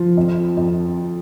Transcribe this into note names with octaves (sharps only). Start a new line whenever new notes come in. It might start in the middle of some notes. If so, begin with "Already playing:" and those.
Already playing: F3
F2
F2